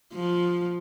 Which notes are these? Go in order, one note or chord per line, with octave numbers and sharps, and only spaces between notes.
F3